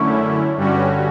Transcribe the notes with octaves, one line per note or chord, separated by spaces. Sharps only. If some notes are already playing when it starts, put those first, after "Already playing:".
Already playing: F#2 D3 A3 C#4 E4 C#6
G2 D3 G3 C#4 F#4